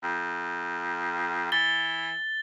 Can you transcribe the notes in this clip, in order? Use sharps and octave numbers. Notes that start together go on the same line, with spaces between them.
F2
E3 A6 G7